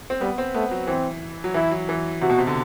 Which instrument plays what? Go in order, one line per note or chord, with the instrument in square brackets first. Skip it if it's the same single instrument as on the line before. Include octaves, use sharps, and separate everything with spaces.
[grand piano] C4
[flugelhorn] G3 [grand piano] B3
[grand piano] C4
[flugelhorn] A3 [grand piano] B3
[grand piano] F#3
[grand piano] E3 [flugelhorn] C4
[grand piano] F#3
[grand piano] E3 [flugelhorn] E4
[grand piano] F#3
E3
[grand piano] C3 [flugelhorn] F#4
[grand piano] B2
C3
D3